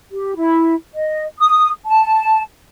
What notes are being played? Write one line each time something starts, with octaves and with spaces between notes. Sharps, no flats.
G4
E4
D#5
D#6
A5